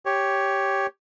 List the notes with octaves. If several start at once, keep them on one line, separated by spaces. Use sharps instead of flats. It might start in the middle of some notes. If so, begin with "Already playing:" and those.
G4 C#5